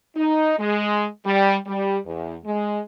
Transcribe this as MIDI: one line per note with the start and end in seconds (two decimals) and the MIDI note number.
0.16 0.54 63
0.59 1.06 56
1.25 1.56 55
1.66 1.97 55
2.05 2.36 40
2.45 2.80 56